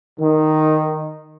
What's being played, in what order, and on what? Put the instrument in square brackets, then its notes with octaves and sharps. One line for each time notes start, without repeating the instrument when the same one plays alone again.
[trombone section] D#3